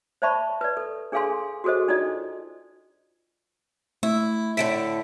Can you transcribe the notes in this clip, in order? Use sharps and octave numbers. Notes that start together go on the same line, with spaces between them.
C5 D5 E5 A5 B5 C#6
B4 D5
A4
D4 G#4 A4 F5 G#5 C6
F#4 G#4 A4 C5 D#5
D4 D#4 F4 A4 D5 D#5
A3 E4
A2 D3 A3 B6 D7